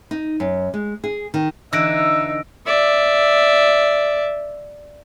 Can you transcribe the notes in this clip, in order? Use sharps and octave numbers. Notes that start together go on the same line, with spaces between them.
D#4
F#2
G#3
G#4
D#3
D3 E3 D#4 E5 E6 A#6 D7
D5 E5